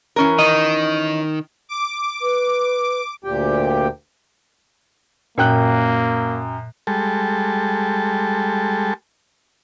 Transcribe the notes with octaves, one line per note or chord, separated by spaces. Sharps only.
E3 C#4 A#4
D#3 D#5
D6
B4
D2 A#2 G4 G5
F#2 A#2 A#3 G5 F#6
G3 G#3 A4